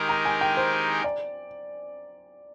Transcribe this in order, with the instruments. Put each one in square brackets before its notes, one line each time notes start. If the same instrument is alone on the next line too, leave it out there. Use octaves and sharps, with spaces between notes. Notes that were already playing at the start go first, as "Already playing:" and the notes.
Already playing: [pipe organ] D#3 G#3 D#4 G4 A#4
[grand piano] A#5
G#5
G5
C5
D5